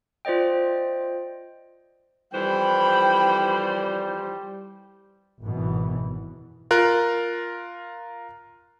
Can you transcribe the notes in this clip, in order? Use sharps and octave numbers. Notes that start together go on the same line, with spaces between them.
F4 C5 D5 D#5 G5
F2 E3 G3 C5 G5 B5
G#1 F#2 B2 E3 B3
F4 A#4 F#6